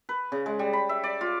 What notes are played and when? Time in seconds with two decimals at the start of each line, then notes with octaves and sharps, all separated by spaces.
0.09 B4
0.32 C#3
0.46 G#3
0.59 G3
0.73 B5
0.89 E5
1.04 D5
1.21 F4